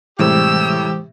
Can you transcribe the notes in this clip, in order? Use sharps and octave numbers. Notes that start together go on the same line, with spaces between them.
A2 C3 E3 G3 G#3 G4 C5 E6